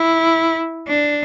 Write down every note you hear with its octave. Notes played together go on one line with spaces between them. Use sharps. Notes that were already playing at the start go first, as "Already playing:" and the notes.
Already playing: E4
D4